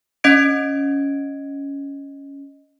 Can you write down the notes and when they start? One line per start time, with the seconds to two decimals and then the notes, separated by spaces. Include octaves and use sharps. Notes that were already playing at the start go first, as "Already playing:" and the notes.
0.24 C#4 D#5 G#6 D7